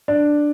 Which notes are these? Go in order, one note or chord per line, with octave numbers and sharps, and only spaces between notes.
D4